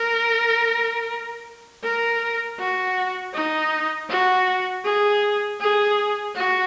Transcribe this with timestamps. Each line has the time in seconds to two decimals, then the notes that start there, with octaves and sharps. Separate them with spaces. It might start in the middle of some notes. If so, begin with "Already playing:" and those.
Already playing: A#4
1.83 A#4
2.59 F#4
3.34 D#4
4.09 F#4
4.85 G#4
5.60 G#4
6.35 F#4